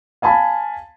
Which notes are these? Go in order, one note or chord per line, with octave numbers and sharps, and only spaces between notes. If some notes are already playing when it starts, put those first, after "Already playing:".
F5 G#5 A5 B5